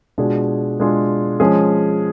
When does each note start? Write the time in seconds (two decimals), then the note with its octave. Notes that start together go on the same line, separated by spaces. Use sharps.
0.18 B2 G#3 D4 F4 G#4
0.79 B2 G#3 D4 F4 G#4
1.40 F3 G#3 C#4 G#4